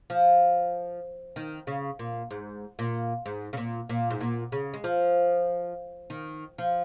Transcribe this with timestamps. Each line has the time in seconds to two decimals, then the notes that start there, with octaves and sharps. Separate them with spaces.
0.10 F3
1.36 D#3
1.67 C#3
1.99 A#2
2.31 G#2
2.79 A#2
3.26 G#2
3.53 C#3
3.57 A#2
3.89 A#2
4.10 G#2
4.21 A#2
4.52 C#3
4.74 G#3
4.84 F3
6.10 D#3
6.58 F3